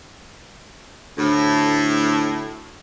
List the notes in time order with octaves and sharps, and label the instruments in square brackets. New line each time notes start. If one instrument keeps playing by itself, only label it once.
[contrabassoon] D2 [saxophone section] A2